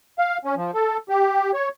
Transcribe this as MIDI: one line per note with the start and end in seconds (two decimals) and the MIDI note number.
0.18 0.38 77
0.45 0.55 61
0.57 0.71 53
0.74 0.97 69
1.09 1.51 67
1.54 1.69 73